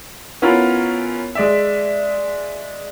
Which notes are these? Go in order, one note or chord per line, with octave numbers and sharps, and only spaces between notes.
B3 C#4 E4 F4 A#4
G#3 D5 E5